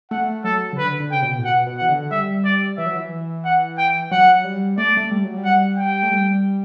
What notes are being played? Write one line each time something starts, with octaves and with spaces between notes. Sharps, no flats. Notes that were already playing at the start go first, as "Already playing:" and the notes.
A3 F#5
F#3 A4
C#3
D3 B4
D3
C#3 G5
B2
A2
B2 F#5
B2
E3 F#5
D3
G3 E5
D5
E3 E5
F#3
E3
F#5
G5
F#3 F#5
G3
A3 D5
A3
G3
F#3
G3
F#5
G5
A3
G3